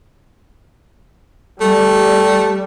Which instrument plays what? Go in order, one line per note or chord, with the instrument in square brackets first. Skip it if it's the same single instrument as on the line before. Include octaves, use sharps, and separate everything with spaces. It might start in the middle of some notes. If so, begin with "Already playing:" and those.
[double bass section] G3 [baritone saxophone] A3